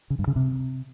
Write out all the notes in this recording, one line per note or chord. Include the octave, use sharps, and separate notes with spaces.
C#3
G2
C#3
C3